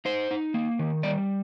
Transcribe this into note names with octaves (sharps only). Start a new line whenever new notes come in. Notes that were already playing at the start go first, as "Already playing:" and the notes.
D#4 C5
D#4
A#3
D#3
G3 D5